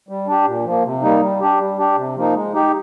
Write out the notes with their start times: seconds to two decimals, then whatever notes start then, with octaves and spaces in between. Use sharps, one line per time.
0.09 G3
0.27 D4 G4
0.46 A#2
0.65 F3 A#3
0.84 C3
1.02 G3 A#3 D#4
1.21 G3
1.41 D4 G4
1.59 G3
1.78 D4 G4
1.97 C3
2.16 F3 A#3 D#4
2.34 G#3
2.53 D#4 G4